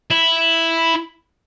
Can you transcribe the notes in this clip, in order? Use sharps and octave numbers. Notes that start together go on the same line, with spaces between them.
E4